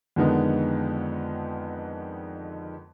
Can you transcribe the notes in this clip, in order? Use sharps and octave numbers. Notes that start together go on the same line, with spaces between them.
F2 D3 D#3 G#3 B3 D#4